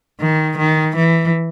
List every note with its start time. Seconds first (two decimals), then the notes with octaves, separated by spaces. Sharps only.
0.21 D#3
0.58 D#3
0.95 E3